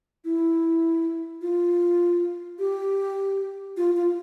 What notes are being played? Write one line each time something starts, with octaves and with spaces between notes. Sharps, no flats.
E4
F4
G4
F4
F4